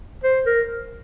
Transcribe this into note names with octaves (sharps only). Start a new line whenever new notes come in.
C5
A#4